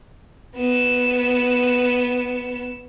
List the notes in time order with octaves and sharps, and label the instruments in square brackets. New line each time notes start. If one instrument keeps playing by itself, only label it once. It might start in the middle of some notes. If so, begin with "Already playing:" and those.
[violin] B3 E7